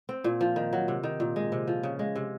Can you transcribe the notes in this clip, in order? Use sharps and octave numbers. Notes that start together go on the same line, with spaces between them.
C4
A#2
F3
D#3
F#3
C3
D#3
A#2
G#3
C3
F3
C#3
G#3
C3